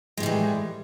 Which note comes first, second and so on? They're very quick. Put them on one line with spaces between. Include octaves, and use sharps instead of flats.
G#3 A2 G3 E3